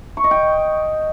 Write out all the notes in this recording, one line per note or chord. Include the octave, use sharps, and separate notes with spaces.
C#6
D#5
G5